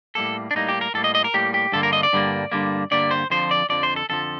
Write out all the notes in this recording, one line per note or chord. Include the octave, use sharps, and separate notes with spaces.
A2 G3 A#3 A4
D4
A2 G3 A#3 D#4
G4
A#4
A2 G3 A#3 A4
D#5
D#5
A#4
A2 G3 A#3 G4
G4
G2 D3 G3 A#3 A4
A#4
D#5
D5
G2 D3 G3 A#3
G2 D3 G3 A#3
G2 D3 G3 A#3 D5
C5
F2 D3 F3 C5
D5
F2 D3 F3 D5
C5
A4
F2 D3 F3 A4